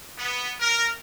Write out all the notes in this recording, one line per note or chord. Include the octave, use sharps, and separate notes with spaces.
B3
A#4